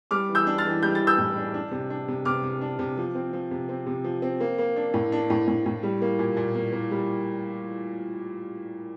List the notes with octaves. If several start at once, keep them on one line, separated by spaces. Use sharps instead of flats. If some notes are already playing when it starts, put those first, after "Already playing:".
G3 D6 F6
E3
E6 G6
D4
F6 A6
E3
G3 G6
A6
E3
E6 G6
A2
D4
D4
C3
D4
C3
C3 D6 F6
C3
D4
C3
F3
C4
F3
C3
C4
C3
F3
C4
A#3
A#3
D4
A2
D4
A2
A2
A2
G3
A#3
A#2
A#2
A#3
A#3
G3